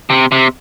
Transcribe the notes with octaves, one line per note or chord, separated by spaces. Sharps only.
C3
C3